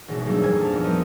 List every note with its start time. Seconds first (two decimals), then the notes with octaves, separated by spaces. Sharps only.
0.08 G#1 B2 E3 G#3
0.25 F#3 G3 A#3 D4 A4
0.42 F2 A#2 G#5 G#6
0.61 A5 F6
0.72 E2 A#2 A#6
0.84 F3 G3 B3 A4 A#4 D#5